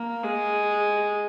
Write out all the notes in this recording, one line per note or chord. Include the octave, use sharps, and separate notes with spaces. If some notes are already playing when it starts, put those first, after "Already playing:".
Already playing: A#3
G#3